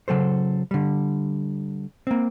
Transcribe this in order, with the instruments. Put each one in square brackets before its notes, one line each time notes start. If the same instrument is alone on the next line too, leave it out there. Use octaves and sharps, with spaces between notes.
[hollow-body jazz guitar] C#3 F#3 A4 C5
D3 G3
A#3 C4